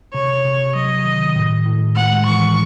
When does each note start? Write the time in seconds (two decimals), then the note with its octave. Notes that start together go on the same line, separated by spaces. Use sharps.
0.14 C3 C#5
0.45 C3
0.75 F#3 D#5
1.05 D#3
1.36 A2
1.66 A2
1.96 G#3 F#5
2.26 E3 C#6